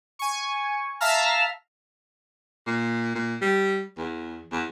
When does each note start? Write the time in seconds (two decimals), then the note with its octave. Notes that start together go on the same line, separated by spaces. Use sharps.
0.19 G#5 C#6
1.01 E5 F5 A5 A#5 F6
2.66 A#2
3.15 A#2
3.41 G3
3.98 E2
4.52 E2